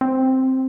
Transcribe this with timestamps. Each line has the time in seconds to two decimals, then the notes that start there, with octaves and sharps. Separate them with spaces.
0.01 C4